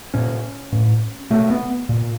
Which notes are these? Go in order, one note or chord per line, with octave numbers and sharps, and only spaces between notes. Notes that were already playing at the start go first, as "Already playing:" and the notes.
A#2 C#4
A2
B2 A3
B3
A#2